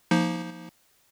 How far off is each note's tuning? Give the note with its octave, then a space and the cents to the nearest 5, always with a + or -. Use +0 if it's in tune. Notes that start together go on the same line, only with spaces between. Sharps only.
F3 +0 A#3 +0 D#4 +15